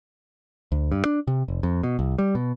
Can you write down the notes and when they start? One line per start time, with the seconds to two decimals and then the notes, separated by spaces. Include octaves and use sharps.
0.72 D2
0.92 G2
1.05 D4
1.27 C3
1.48 F1
1.63 F2
1.83 B2
1.99 C2
2.18 G3
2.35 B2